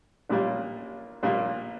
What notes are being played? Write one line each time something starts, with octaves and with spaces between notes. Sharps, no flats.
A#1 A#2 G3 A#3
A#1 A#2 G3 A#3